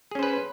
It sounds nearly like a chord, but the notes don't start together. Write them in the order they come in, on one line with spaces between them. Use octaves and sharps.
G#4 C#4 C5 B4